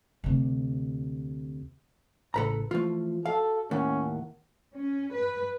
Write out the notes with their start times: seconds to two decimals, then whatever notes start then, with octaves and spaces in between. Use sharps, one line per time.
0.24 D2 C3
2.34 A1 A2 C#3 A4 B4 A#5
2.71 E3 F3 A3 F4
3.26 F#4 A4 F5
3.71 D#2 A2 C#4 A#4 F#5
4.74 C#4
5.12 B4